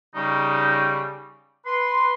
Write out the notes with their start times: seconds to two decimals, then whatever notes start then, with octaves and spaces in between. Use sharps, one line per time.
0.15 C#3 G3 D#4
1.66 B4 C6